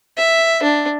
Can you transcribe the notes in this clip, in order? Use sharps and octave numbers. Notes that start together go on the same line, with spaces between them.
E5
D4